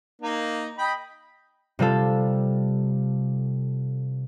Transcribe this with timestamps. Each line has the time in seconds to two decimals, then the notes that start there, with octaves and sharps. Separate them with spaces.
0.22 A#3 D#4
0.78 D#5 G5 B5
1.79 C3 G3 F4 A4